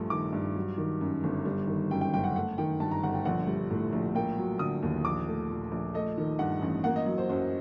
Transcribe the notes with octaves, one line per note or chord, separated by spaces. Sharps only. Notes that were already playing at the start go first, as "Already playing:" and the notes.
Already playing: A#1 G2 A3
D#3 D6
G2
F#3
D#3
F#2
G1
G3
D#3
F#2 G5
G5
F#1 G5
F#5
A3 F#5
D#3 G5
G2 A5
A#5
G1 F#5
G5
A#1 F#5
G3
A2
A#1
A#3 G5
F#3
D3 D#6
D#2
A#1 D6
A3
A#2
A#1
A3 D#5
D#3
G2 F#5
A1
A#3 F#5
D#5
F#3
C5
F#2 C5